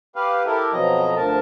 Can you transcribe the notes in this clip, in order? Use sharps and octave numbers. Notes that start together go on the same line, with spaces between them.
G4 B4 F5
E4 G4 A4 A#4
F2 B2 F3 F#3 D#5 A#5
D2 F3 A#4 A5